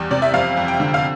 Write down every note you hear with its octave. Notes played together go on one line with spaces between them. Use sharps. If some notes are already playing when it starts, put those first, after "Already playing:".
Already playing: E2 G3 G5
C3 D5
E5
F2 F5
F2
G5
D3
F5